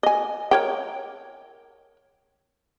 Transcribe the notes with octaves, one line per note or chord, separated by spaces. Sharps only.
D#5 G#5
A#4 C#5 G5